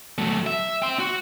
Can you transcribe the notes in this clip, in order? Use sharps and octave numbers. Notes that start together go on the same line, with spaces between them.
F#3 A3
E5
G5 C6
F#4